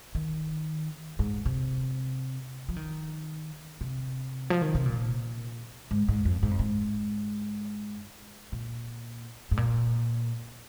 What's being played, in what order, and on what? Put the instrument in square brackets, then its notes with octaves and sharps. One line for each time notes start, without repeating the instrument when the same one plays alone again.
[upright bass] D#3
G#2
C3
F3
D#3
C3
F3
D#3
C3
A#2
G#2
G#2
F2
G#2
F2
G#2
A#2
G#2
A#2